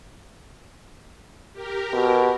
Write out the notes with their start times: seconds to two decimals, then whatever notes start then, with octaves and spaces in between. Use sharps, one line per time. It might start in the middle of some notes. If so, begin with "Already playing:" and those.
1.53 G4 A#4
1.93 B2